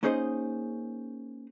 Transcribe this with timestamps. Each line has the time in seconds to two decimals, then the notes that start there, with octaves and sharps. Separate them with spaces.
0.03 A#3 C#4 D#4 G#4 C5 D#5